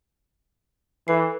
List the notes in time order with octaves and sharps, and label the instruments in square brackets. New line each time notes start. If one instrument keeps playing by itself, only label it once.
[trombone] E3 [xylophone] A4 B4 C7